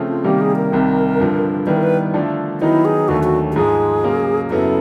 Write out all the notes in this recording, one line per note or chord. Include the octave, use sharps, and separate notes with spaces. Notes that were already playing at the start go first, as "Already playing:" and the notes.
Already playing: C#3 F3 A3 C4
F4
C3 D#3 G3 A#3 G4
G#4
A#4
C2 C3 D#3
G2 D3 F3
D#3 G3 B3 E4 B4
A#4
B4
D3 F3 A3 D4
D#3 F#3 B3 D#4 E4
G#4
D#2 D3 F#3 A3 F#4
F#4
G4
G#2 F3 G#3 G#4
C#3 F#3 A#3
F#2 C#3 F#3 B3 E4 A4